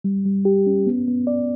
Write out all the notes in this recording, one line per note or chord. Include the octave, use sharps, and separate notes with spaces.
G3
G3
G4
C#4
B3
B3
D5